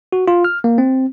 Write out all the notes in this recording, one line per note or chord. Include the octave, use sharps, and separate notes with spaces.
F#4
F4
F6
A#3
C4